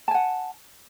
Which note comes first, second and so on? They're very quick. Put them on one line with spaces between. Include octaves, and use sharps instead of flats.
A5 G#5 F#5